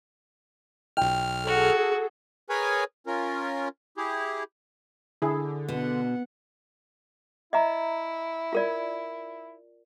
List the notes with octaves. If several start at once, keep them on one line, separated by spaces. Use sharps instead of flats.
B1 G5 F6
F#4 G#4 A4
G#4 A#4 B4 C#5 G#5
C#4 F4 A#4
E4 G4 G#4
D3 E4 G#4
B2 B3 F#5
E4 D#5 E5 A#5
F4 A#4 D5